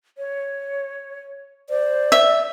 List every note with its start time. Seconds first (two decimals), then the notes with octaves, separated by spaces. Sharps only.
0.18 C#5
1.70 C5 D5
2.12 E5